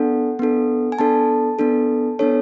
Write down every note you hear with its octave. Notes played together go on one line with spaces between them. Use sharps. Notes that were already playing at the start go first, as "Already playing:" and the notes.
Already playing: B3 D4 A4 F#5
B3 D4 A4
G#5
B3 D4 A4 A5
B3 D4 A4
B3 D4 A4 C#5